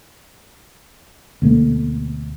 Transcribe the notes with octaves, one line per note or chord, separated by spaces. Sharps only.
D2 B2 A3 A#3